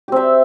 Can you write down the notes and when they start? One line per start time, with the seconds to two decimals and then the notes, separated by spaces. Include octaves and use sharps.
0.08 G4
0.12 C4
0.16 E5